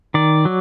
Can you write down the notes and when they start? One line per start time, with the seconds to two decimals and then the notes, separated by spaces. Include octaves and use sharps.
0.14 D#3 D5
0.45 F#3